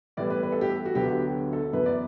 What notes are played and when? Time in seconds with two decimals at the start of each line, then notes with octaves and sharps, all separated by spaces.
0.17 A2 E3 G3 B3 D5
0.30 B4
0.43 B4
0.52 A4
0.61 G4
0.70 A4
0.85 F#4
0.95 D2 D3 F#3 B3 G4
1.08 G4
1.53 A4
1.73 F#2 E3 B3 B4
1.86 D5